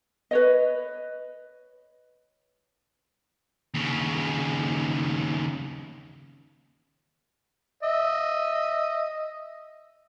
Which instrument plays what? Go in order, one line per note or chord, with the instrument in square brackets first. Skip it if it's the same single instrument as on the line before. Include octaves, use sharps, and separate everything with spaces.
[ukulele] B4 C#5 D#5
[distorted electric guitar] D#2 C#3
[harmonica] D#5 E5